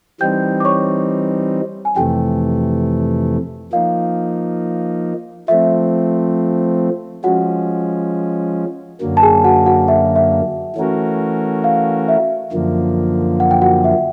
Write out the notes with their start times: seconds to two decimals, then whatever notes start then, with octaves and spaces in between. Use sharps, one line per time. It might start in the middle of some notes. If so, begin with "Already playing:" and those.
0.21 E3 G3 C4 D#4 G5 G6
0.60 D6
0.65 C#5 C#6
1.85 G#5
1.96 F2 C3 E3 A3 G4 G5
3.73 F3 A#3 D#4 F5
5.48 F3 A3 C4 E5
7.24 F3 G#3 C#4 F#4 F#5
9.01 F#2 D3 F#3 A#3
9.17 A5
9.22 G#4 G#5
9.44 F#4 F#5
9.66 F#4 F#5
9.88 E5
10.16 E5
10.76 E3 A3 C#4 F#4 A#4
11.64 F5
12.08 E5
12.52 F#2 D3 F3 A#3
13.40 F#5
13.51 G5
13.62 F#4 F#5
13.84 E5